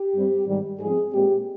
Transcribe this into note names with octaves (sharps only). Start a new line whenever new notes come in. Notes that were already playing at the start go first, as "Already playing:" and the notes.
Already playing: G4
G2 G3 C4
G#2 D#3 G3
G#2 F3 C4 G#4
A#2 G#3 C4 G4